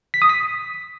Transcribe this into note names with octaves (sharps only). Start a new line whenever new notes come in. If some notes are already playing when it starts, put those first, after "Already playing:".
B6
D#6
B6